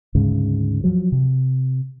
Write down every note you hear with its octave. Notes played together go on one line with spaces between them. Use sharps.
D2 G#2 C#3
F3 F#3
C3